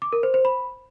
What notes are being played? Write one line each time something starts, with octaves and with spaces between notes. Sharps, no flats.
D6
A#4
C5
C5
B5